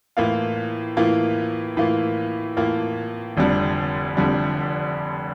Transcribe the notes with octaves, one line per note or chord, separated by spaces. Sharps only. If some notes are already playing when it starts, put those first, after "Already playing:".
A2 E3 A#3 F4
A2 E3 A#3 F4
A2 E3 A#3 F4
A2 E3 A#3 F4
F1 F2 D3 G3
F1 F2 D3 G3